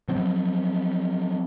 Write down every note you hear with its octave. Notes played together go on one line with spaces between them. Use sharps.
F3 F#3 C4